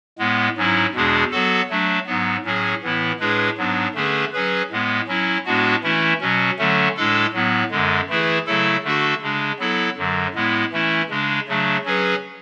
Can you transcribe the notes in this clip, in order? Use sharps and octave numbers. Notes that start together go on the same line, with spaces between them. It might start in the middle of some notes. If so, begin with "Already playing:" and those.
A2 G#3 B3
G#2 F#3 C#4 E4
E2 B2 G#3 D4 G#4
F#3 B3 F#4 A4
F#3 A3 D4
G#2 F#3 B3
A2 F#3 C#4 G#4
A2 E3 B3 E4
A2 G#3 D4 G#4 B4
G#2 F#3 B3 D4
D3 A3 C#4 G#4 B4
F#3 C#4 G#4 B4
A2 G#3 B3
F#3 C#4 E4
A2 G#3 B3 D4 F#4
E3 A3 C#4 E4
B2 F#3 C#4
D3 F#3 A3 C#4
A2 G#3 D4 A4
A2 F#3 B3
F#2 D3 G#3
E3 A3 E4 G#4 B4
C#3 F#3 A3 E4 A4
D3 A3 D4 F#4 A4
C#3 G#3 D4
F#3 B3 E4 A4
F#2 D3 F#3
A2 G#3 B3 E4
E3 A3 C#4 E4
C#3 G#3 D4
C#3 F#3 A3 D4
F#3 C#4 G#4 B4